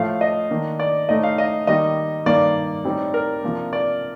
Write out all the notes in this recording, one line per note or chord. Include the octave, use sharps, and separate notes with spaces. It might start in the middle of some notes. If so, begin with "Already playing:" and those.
Already playing: A2 F3 A3 F5
D#5
D#3 A#3 D4
D5
A2 A3 D#4 D#5
F5
D#5
D#3 G3 A#3 D#4 D#5
G2 D#3 A#3 D#4 D5
A2 G3 C4 D#4
A#4
C3 F3 A#3 D4
D5